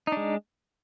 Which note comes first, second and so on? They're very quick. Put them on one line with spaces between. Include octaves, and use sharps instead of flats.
D#4 D4 G#3